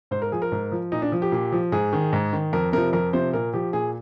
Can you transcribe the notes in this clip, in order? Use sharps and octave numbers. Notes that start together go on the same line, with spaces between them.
G#2 C5
A#4
F3 G#4
A#4
G#2
F3
A#2 D#4
D4
F3
G4
A#2
F3
G#2 G#4
D#3
G#2
D#3
F2 A#4
C3 F3 A#4
F2 A#4
C3 F3 C5
A#2 A#4
F3 G4
A#2 G#4